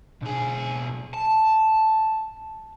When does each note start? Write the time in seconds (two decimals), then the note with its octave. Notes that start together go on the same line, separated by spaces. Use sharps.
0.22 B1 G#4
1.14 A5